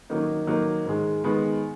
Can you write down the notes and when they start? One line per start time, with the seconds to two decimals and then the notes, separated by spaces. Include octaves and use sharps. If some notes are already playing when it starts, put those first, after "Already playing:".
0.10 D#3 F#3 A#3 D#4
0.46 D#3 F#3 A#3 D#4
0.84 G#2 D#3 G#3
1.24 D#3 G#3 B3